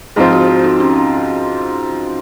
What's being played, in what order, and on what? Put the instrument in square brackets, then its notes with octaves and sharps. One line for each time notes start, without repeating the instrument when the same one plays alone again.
[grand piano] G#2 F3 C4 F4 [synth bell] G#4
[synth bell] F#4
F#4
D#4
C#4